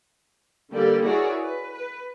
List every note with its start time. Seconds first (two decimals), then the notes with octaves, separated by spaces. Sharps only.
0.70 D3 G3 A#3 G4 A4 D5
1.02 E4 F#4 G#4 A#4 C#5 D5
1.40 B4
1.73 B4